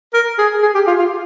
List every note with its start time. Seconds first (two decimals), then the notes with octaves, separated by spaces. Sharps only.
0.14 A#4
0.38 G#4
0.62 G#4
0.75 G4
0.87 F4
0.99 F4